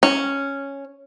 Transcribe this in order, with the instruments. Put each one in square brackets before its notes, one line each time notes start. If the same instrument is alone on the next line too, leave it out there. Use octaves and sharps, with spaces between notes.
[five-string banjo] C#4